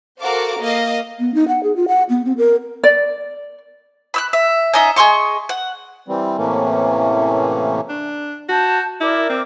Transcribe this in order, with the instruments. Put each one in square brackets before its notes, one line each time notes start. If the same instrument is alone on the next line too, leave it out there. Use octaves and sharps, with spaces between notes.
[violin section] F#4 A4 A#4 C5 F5 D6
A#3 D#5 F5
[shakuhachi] B3
D#4
F#5
G#4
F4
F#5
B3
C4
A#4
[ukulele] D5
[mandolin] B5 E6 F#6
E5
C#4 D#4 D#5 E5
G#4 D#5 C6 C#6
F#5
[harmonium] E3 G3 C4
A2 C3 E3 A3 A#3 C#4
[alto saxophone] D4
[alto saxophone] F#4 [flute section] A5 G6
[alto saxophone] E4 [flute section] A#4 D5 D6
[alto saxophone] C4